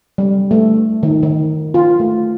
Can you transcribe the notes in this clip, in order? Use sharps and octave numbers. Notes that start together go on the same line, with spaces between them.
G3
A3
D#3
D#3
F4
A3